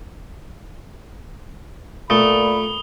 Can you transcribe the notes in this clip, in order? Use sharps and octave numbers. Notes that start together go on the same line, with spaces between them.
A#2 A3 B5 D#6 G7